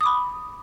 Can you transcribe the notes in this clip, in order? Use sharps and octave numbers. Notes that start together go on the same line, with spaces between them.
B5 D6 D#6